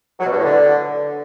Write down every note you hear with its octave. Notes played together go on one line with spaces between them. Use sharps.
F#3
B2
G2
A2
D3